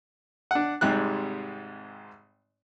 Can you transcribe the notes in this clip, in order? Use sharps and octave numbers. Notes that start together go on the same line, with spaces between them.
D4 F#5
G#1 G#2 C3 G3 F#6